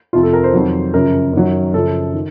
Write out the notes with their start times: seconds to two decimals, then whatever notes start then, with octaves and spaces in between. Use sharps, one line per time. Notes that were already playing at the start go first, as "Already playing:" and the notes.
0.13 F2 C3 F3 F4
0.23 A4
0.33 A#4
0.44 C5
0.54 F2 D#3 F#3
0.94 F#2 C#3 F3 A#4
1.33 F#2 D#3 F#3
1.73 F#2 C#3 F3 A4
2.14 D#3